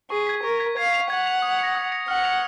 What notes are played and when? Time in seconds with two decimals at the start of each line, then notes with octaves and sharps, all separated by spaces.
0.10 G#4 C#6
0.27 G#6 B6
0.43 A#4 C#6
0.60 G#6 B6
0.77 F5 G#6
0.93 B6 F7
1.10 F#5 G#6
1.26 B6 F7
1.42 D#6
1.59 A#6 C#7
1.75 D#6
1.92 A#6 C#7
2.08 F#5 F6
2.24 A#6 C#7 F7